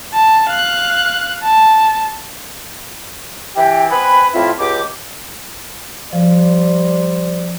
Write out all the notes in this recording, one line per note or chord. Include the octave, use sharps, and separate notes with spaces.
A5
F5 F#6
A5
E3 G4 G5
C4 B4 F#5 G#5 B5
F2 A2 C4 E4 F4 E5
C#2 G4 D6
F3 G3 C5 D5